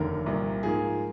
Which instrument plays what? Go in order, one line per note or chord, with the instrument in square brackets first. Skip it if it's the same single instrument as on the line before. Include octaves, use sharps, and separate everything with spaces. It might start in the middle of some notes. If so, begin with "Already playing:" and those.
Already playing: [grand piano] F1 D#2 D3 A#4
C2 A#2 G3 A#3
G#2 F3 A#3 G#4